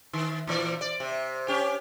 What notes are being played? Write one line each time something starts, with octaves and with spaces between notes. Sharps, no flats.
D#3
A#2 E3 D5
D5
C3
C#4 G4